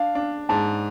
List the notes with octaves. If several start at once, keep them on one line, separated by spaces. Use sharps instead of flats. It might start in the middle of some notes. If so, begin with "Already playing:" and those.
Already playing: D4 F5
D4
G#2 A5